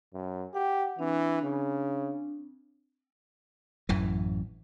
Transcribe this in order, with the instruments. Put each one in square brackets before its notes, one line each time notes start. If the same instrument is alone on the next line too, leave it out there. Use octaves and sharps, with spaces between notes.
[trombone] F#2
[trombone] G4 [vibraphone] F#5
[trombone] E3 [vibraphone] C4 D4
[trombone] C#3
[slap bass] A1 F#2 E3